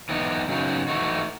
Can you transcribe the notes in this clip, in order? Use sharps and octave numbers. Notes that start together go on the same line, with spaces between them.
E3 B3 D#4
C#3 F#3 B3 D#4
E3 A3 D#4 F#4